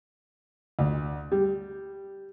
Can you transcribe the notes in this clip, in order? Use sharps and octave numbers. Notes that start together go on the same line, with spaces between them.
D2
G3